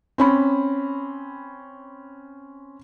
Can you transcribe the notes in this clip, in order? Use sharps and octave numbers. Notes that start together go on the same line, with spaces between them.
C4 C#4 B5